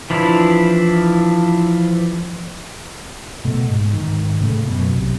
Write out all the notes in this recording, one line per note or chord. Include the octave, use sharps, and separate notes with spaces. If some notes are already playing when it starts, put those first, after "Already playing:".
E3 F3 D4 E4
B2 A3
G#2
G#2 D#3
A2 C#3 G#3 A3
F#2 B2
B1 C3